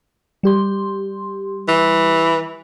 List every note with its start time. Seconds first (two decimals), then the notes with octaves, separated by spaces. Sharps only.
0.43 G3 G4 C6
1.68 E3